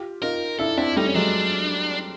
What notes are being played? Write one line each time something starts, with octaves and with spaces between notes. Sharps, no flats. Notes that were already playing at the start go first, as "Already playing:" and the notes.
Already playing: F4 G4
D#4 F4 A#4
D4 E4 A4
C4 D4 E4
G3 A3 D#4
C#4
F#3 G#3 D4